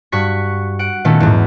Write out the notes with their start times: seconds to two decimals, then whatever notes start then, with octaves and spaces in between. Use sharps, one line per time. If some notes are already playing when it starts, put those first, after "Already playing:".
0.12 G2 F#4 C#6 B6
0.79 F#5 D7
1.05 A#2 D#3 A3 B3 C#4
1.20 E2 G#2